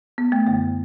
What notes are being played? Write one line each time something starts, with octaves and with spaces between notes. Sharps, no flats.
B3
A3
F#2 D3 A3